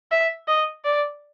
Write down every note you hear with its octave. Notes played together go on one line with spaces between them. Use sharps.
E5
D#5
D5